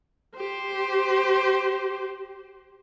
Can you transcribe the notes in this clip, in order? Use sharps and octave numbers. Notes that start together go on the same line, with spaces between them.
G4 C5